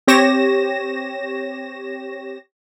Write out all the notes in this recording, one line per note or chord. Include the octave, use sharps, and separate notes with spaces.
C4 G4 C#5 A#6 E7